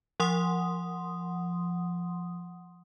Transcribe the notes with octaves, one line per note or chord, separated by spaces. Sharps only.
F3 F#5 C6 D#6